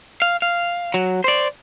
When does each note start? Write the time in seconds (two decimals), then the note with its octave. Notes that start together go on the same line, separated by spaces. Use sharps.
0.22 F5
0.42 F5
0.94 F#3
1.24 C5 D5